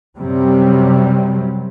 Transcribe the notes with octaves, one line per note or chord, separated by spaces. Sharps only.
F#2 C3 F#3 G3